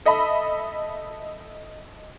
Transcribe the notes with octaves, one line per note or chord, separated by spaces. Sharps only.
A4 D#5 E5 B5